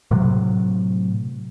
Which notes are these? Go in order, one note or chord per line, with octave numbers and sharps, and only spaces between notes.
A2 C3 F#3